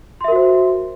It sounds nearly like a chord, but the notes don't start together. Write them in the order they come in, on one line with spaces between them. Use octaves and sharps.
C6 E5 A#4 F#4 C5